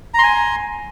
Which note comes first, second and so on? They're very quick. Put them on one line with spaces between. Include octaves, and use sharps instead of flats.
A#5 C6 G#5